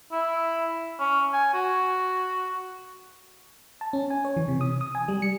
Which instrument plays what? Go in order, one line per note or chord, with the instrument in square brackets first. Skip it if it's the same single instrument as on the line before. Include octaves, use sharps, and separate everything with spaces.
[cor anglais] E4
C#4
G#5
F#4
[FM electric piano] A5
C#4
G#5
C#5
E3
C3
D#6
D#6
G#5
G3
C#7